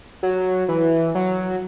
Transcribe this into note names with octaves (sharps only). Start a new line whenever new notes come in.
F#3
E3
F#3